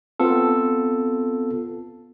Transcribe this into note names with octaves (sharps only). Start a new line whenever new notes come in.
B3 C4 F4 A4